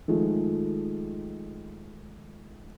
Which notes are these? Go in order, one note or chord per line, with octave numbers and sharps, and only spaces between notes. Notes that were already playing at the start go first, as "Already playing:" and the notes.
D#3 F3 G#3 A3